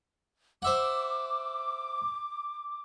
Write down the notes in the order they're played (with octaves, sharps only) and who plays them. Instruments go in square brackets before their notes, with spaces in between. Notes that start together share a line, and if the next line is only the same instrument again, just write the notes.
[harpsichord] C5 E5 F#5 [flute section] D6